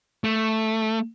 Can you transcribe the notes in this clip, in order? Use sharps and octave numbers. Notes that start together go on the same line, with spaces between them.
A3